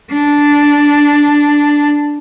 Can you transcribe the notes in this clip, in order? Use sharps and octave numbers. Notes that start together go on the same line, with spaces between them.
D4